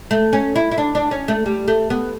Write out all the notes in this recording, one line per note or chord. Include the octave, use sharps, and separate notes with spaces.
A3
C#4
E4
E4
D4
D4
C#4
A3
G3
A3
B3